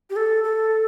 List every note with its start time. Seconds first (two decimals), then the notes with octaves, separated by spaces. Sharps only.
0.10 G4
0.16 A4
0.44 A4